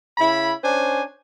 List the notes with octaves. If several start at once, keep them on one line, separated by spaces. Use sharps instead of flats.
C#3 E4 B5
C#4 D4 C5 G#5